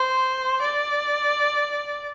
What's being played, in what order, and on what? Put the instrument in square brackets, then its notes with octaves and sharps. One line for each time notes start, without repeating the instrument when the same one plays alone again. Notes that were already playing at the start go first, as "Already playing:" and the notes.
Already playing: [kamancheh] C5
D5